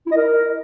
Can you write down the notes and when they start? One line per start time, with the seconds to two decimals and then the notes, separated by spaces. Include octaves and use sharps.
0.06 E4
0.11 D#5
0.16 A#4